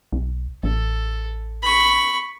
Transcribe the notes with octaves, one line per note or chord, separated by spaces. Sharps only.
B1
A1 A4
B5 C#6